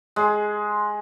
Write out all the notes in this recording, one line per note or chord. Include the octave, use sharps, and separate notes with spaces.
G#3